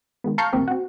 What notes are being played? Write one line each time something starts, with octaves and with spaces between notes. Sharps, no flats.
D#3 G#3 B3
F5 A5 A#5 C#6 F6 G6
A1 D#2 A#2 C4 G4 A#4
C4 F#4